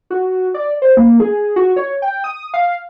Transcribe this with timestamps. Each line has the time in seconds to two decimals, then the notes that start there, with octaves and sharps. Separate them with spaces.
0.10 F#4
0.54 D5
0.82 C5
0.97 A#3
1.20 G#4
1.56 F#4
1.76 C#5
2.02 G5
2.24 D#6
2.54 F5